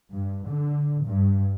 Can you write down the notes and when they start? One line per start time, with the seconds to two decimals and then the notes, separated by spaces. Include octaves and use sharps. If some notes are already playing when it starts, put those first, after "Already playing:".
0.11 G2
0.48 D3
1.05 G2